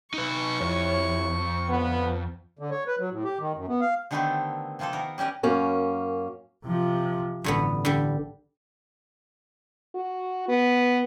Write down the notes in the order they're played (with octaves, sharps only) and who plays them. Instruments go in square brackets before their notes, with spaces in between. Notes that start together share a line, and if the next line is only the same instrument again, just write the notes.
[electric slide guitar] D#4 B4 [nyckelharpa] C#6
[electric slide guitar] F2 [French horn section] E4 G4 C#5
[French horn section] D3 F3 B3
[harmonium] D3
C#5
B4
F#3
A2
G4
D#3
F#2
B3
F5
[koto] D3 D#3 A3 B3 C4 G4
C3 F3 A#3 C4 A4
D#3 B3 A#4
G3 C#4 G4 A#4 B4
[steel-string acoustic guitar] F#2 A#3 C#4
[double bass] C3 F3
[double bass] A1 [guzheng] G2 D3 B3
[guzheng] D3 G3
[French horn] F#4
B3